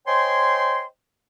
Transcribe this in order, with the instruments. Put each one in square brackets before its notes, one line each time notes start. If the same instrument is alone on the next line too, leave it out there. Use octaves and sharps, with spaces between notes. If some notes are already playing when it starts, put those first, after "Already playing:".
[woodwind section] C5 C#5 D#5 G5 G#5 C6